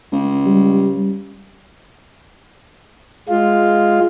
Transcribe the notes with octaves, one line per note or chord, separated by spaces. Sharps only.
C#2
G3
G#3 F4